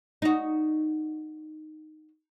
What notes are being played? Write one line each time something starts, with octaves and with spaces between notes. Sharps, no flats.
D#4 F#4